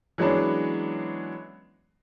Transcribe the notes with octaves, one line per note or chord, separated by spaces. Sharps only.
E3 F#3 G#3 B3 C#4 D4